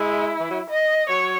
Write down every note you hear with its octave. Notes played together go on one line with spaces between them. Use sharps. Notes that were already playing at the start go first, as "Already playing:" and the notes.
Already playing: G#3 E4
E3
F#3
D#5
F#3 C#5